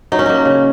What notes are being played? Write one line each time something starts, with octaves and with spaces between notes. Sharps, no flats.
F#3 D#4
C#4
A#3 D#4
C#3